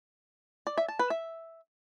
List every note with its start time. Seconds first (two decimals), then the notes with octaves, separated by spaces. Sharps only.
0.67 D5
0.77 E5
0.88 A5
0.99 B4
1.10 E5